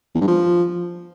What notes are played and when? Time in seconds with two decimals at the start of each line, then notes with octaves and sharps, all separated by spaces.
0.14 E2
0.21 G2
0.27 F3